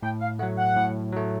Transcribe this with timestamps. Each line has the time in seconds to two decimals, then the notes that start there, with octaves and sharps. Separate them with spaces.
0.03 A2 G5
0.21 F5
0.39 A3 F#5
0.43 F#3
0.58 F#5
0.76 A2
1.12 F#3 A3